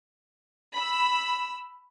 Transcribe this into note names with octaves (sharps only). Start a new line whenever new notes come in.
B5 E6